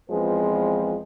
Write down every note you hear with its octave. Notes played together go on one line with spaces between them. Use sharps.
E2 F3 G#3 C4 F4 B4